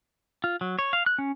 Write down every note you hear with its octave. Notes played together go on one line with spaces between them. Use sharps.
F4
F#3
C#5
F5
F#6
C#4